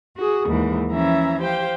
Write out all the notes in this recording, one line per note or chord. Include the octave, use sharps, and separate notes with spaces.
F#4 G#4
D#2 G#2 E3
E3 F3 C#4 E5 A#5 G#6
G4 C5 F5 G5